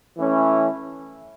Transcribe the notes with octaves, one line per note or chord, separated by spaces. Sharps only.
E3 A3 C#4 E4